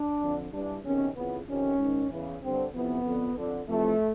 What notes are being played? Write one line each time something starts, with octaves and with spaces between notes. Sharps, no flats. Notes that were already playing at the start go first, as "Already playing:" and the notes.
Already playing: D4
F2 D3
G2 E3 D4
E2 C3 D#3 C#4
F2 C#3 E3 B3
F2 C3 D#3 C#4
G#2 D#3
E2 C#3 E3
G2 D3 C4
F2 C3 E3 B3
F2 D3
F2 D3
F2 C3 E3 A3